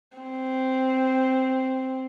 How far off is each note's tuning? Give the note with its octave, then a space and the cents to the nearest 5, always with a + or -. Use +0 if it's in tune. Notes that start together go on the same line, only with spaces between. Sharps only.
C4 -5